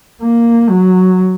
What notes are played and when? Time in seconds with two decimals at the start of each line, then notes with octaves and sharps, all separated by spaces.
0.22 A#3
0.70 F#3